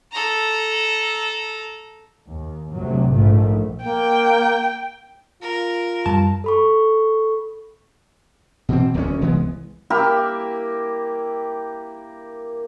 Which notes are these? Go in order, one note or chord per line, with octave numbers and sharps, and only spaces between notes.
A4 A#5
D#2
D2 C3 F#3
A#1 G#2 A3
A#3 G5
F4 A#4
F#2 G3 A5
A4 B5 C#6
B2 E3 C4
D1 D2 A#3 C#4
C2 E3 G#3 B3
A#3 E4 G4 A#4